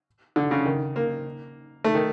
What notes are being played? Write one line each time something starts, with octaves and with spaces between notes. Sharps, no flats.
D3
C#3
D#3
A#3
A3
D#3